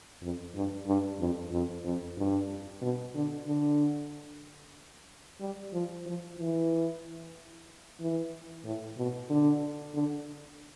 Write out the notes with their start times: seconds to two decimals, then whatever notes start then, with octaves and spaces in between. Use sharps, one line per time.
0.22 F2
0.55 G2
0.87 G2
1.19 F2
1.52 F2
1.85 F2
2.17 G2
2.82 B2
3.14 D3
3.47 D3
5.41 G3
5.73 F3
6.06 F3
6.38 E3
8.00 E3
8.65 A2
8.98 B2
9.30 D3
9.94 D3